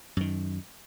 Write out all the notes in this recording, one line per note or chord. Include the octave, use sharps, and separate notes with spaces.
F#2 D#3